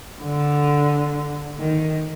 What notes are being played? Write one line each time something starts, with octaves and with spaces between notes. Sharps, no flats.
D3
D#3